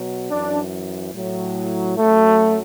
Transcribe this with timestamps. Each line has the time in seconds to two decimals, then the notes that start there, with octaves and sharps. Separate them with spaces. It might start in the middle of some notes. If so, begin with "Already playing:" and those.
Already playing: B2 F#3
0.30 F#2 E3 D4
1.15 A2 F#3
1.98 F#2 F#3 A3